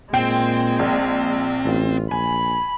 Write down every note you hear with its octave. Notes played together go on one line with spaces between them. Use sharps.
A#2 G#3 C4 G5
A#1
A1 F4
A#1 G#5 B5